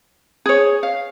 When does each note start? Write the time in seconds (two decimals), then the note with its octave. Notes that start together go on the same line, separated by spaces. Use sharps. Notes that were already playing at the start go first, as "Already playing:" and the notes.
0.46 G#4 C#5
0.83 F5